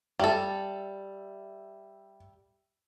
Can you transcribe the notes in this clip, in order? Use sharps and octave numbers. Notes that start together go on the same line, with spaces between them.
G3 A4 E5